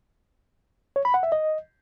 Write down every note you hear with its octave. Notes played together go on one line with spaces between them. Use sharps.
C#5
B5
F#5
E5
D#5